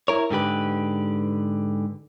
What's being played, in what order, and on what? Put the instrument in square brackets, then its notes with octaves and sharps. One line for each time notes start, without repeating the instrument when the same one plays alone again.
[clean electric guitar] E4 A#4 C#5
G#2 D3 G4 B4